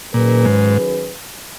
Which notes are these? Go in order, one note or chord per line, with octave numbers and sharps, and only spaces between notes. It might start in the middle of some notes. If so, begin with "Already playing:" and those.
A#2 D#3 F#3 C#4 G#4 B4
G#2